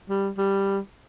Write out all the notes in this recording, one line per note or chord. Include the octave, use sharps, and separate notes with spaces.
G3
G3